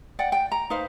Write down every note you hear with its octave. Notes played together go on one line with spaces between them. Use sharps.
D5 F#5 G5
G5
A#5
D#4 B4 C5 F5